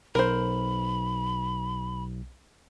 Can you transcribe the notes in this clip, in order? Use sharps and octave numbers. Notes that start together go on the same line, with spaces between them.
B1 A#4 C5 B5